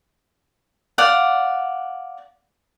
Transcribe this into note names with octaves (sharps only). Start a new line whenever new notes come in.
D5 F5 F#5